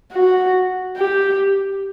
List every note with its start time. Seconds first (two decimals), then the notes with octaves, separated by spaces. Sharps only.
0.13 F#4
0.97 G4